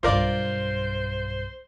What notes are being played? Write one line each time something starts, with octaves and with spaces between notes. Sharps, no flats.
B1 G2 F4 A#4 C5 D5